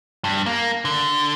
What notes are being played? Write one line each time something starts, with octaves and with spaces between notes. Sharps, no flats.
G2
A#3
D3